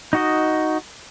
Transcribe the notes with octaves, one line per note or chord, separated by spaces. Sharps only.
D#4 F#4 D#5